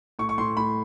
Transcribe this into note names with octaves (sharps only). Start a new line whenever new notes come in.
A2 C#6
C#6
A2 C6
A2 B5